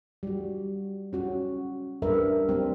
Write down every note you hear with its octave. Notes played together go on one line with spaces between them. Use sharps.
G3 F#4
C#4 F#4
G3 D4 A#4 B4 E5
G3 C4